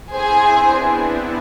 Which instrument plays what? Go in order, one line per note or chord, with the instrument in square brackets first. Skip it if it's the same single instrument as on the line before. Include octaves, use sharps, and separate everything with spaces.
[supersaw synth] C4 E4 [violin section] G#4 C5 G#5
[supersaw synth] B3 D4
B3 D4